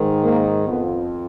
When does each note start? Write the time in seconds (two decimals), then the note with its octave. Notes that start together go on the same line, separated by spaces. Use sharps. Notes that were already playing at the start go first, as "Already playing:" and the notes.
Already playing: G#2 D#3
0.24 A#3
0.68 F2 F3 B3